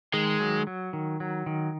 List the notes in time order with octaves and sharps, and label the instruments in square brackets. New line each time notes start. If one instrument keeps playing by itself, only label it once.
[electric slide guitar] D#3 [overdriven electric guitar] G#3
[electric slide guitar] F#3
F#3
D#3
F#3
D#3